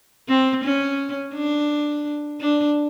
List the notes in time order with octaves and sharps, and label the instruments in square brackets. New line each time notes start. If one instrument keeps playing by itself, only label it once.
[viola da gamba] C4
C#4
D4
D4